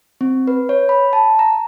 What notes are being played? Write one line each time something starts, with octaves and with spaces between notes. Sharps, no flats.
C4
B4
C#5
B5
A5
A#5